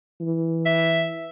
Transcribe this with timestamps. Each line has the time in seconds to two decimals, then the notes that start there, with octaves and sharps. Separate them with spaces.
0.20 E3
0.66 E5